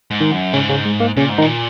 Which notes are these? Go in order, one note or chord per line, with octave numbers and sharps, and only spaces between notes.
G#2
D#3 D#4
F#2
G#2 C#3 C#4
C#3 C#4
G#3
A#3
A#2 C#3 C#4
G#2
D#3 D#4
A#2